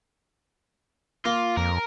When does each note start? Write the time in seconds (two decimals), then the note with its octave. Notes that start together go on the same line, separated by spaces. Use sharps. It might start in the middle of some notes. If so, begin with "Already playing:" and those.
1.25 A#3 F4
1.57 F2 A#4